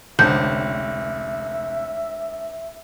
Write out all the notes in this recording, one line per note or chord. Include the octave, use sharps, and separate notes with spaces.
F1 C#2 D3 C4 E5 G6